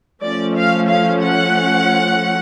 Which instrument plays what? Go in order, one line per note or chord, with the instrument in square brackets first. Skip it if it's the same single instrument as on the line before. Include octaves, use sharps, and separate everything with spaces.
[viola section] F3 A3 C#4 D5
F5
F5
F#5